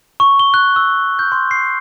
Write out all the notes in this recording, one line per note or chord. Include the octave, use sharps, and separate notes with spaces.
C#6
G7
F#6
E6
G6
C6
C7